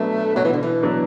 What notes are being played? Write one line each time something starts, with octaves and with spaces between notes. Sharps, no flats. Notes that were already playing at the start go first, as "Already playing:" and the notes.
Already playing: B2 F#3 A3 B3 D4
B2 F#3
E3
D3
E3
F#3 B3 D4